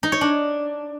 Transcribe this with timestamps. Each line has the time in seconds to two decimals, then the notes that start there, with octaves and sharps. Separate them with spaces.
0.03 D#4
0.12 C#5
0.21 D4